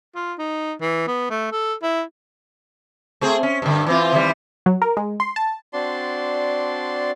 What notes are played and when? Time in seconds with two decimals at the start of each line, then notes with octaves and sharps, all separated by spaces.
0.16 F4
0.39 D#4
0.81 E3
1.08 B3
1.30 A3
1.52 A4
1.82 E4
3.21 A3 C4 G#4
3.43 C#4
3.62 G2 D3
3.86 E3 C4 F4
4.13 D#3 E3 G3
4.66 F#3
4.82 A#4
4.97 G#3
5.20 C6
5.36 A5
5.73 C4 D4 F#4 D5 A5 C6